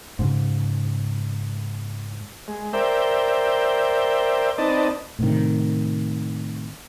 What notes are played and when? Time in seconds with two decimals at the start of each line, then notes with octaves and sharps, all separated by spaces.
0.19 G#2 C#3
2.48 G#3
2.73 A#4 C5 D5 E5 G5
4.58 C4 D#4 B4 D5 D#5 A5
5.19 A2 C3 D#3